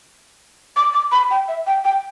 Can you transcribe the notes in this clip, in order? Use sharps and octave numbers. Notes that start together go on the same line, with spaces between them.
D6
D6
B5
G5
E5
G5
G5